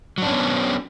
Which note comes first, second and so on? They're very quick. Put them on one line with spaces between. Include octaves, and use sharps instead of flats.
F#3 D4 C#4 B3